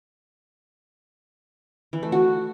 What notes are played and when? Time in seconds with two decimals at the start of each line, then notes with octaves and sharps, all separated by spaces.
1.93 E3
2.03 A3
2.12 F#4